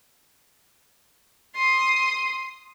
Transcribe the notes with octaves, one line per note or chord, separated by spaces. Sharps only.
C6 D#6